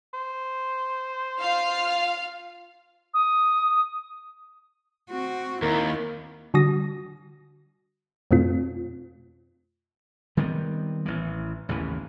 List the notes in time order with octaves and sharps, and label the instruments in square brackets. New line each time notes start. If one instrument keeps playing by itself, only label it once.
[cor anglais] C5
[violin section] F4 F5 F6
[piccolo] D#6
[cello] C4 F#4
[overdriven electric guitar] D#2 [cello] E4 [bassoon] A#4
[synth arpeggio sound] D3 G3 F#4 D#6 A#6
F2 B2 A3 C4 F4
[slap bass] D#3 G3 B3 C4
A1 E3
A1 D#2 C#3 E3